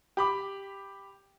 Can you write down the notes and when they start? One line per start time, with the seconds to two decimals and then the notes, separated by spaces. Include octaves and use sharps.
0.17 G4 B5 D6